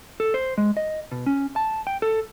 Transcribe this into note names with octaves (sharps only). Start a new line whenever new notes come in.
A4
C5
G#3
D#5
B2
C#4
A5
G5
A4